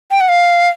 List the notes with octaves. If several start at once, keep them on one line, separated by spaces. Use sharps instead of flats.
G5
F#5
F5